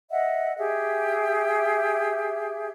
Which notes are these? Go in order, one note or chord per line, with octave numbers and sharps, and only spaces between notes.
D#5 E5 F#5
G4 G#4 E5